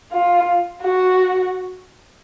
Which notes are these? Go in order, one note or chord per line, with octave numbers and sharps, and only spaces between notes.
F4
F#4